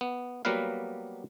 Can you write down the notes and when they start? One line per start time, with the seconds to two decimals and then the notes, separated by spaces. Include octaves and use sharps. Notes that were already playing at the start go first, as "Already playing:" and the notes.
0.01 B3
0.45 F#3 G3 A#3 B3 B4 F5